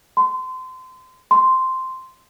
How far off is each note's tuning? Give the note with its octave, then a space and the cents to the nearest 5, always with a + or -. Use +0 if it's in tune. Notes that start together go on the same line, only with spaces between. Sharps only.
C6 -30
C6 -5